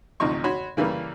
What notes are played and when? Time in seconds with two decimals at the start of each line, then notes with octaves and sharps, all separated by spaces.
0.20 A1 D2 C3 F3 D#4 C#6
0.44 F#4 C#5 B5 C6
0.77 C#3 E3 G3 A#3